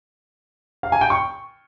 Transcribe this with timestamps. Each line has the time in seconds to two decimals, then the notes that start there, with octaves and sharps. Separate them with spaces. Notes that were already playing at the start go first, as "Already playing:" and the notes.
0.83 F5
0.92 G#5
1.01 G5
1.10 C#6